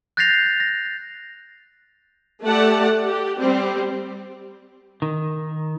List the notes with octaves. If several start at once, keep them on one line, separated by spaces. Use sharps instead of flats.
F#6 G6 A6 A#6 C7 F7
A#6
A3 G4 A4 D5 F#5 A5
G4
G3 C4
D#3